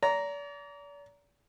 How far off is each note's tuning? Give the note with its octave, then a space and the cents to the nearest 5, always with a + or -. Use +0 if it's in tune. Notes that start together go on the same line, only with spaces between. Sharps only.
D5 -40 A#5 +0